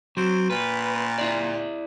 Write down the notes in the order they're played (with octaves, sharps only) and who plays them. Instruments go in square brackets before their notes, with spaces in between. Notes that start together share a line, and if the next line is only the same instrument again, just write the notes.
[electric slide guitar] F#3 [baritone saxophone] C4
[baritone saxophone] A#2 [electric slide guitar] B4
[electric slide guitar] E4 D5